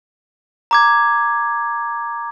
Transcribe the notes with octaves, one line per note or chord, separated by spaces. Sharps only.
A#5 D6 G#6